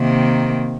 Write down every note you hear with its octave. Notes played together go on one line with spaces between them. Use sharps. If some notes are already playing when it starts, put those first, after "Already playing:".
Already playing: C3 D#3 A#3